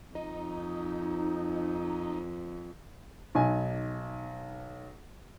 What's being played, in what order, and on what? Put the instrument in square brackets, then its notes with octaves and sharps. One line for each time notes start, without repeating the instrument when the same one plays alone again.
[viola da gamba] F2 [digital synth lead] D#4
[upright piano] B1 D#4 G#5